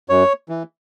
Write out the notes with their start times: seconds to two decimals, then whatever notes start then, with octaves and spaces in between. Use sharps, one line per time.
0.09 F#2 C#5
0.49 E3